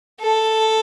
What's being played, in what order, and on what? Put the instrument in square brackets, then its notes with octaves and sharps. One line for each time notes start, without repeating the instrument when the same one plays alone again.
[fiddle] A4